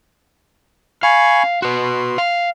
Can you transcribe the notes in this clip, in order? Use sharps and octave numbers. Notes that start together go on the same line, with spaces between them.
F5 G#5 B5 C#6
F#4 B4 C6
F5